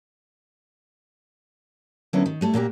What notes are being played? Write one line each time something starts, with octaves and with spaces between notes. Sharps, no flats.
D3 F#3 A#3 B3 C#4 E4
D#3
G3 A3 E4
A#2 A#3 F#4 G4